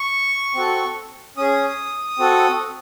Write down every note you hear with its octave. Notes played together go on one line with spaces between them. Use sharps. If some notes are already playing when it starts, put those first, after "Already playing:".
Already playing: C#6
C4 F#4 A4
C#4 G#4 D#6
C4 F#4 A4